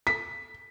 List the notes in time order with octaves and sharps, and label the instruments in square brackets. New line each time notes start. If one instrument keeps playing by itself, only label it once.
[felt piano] B6